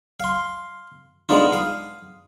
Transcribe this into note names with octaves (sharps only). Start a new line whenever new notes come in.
F5 C6
G#3 B3 D4 D#4 F4
F5 D#6